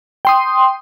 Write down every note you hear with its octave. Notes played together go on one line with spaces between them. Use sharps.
G5 C6 D#6